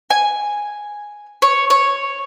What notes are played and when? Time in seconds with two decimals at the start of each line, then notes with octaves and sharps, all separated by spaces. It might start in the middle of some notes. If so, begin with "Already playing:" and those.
0.10 G#5
1.42 C#5
1.70 C#5